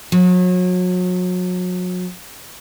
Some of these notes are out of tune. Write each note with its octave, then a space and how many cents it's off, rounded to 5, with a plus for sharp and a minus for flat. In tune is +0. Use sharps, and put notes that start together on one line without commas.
F#3 -35